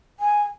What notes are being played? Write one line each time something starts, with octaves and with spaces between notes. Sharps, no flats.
G#5